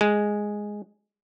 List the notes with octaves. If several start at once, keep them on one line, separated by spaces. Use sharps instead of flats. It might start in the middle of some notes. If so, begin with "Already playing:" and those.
G#3